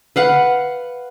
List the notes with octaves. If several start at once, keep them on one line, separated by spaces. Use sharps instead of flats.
B4 F5 F#5